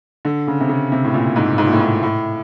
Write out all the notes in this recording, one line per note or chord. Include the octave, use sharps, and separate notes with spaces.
D3
C#3
C3
C#3
C3
A2
A#2
G#2
G#2
A#2
A2
G#2
A2